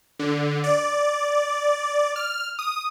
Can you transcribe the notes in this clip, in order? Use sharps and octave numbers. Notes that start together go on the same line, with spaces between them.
D3
D5
F6
D#6